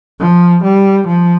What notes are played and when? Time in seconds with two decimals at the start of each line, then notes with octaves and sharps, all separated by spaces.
0.20 F3
0.63 G3
1.07 F3